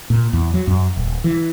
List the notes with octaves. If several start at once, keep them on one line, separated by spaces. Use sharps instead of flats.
A#2
E2
F#3
F#2
D#1
E3